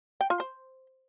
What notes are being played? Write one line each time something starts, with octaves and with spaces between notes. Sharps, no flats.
G5
F4
C5